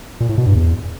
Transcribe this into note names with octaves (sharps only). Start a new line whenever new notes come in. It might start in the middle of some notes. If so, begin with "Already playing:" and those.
A#2
A2
B2
G2
E2